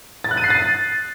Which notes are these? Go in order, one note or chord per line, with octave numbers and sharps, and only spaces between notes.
A6
F#6
D#7
C7
A6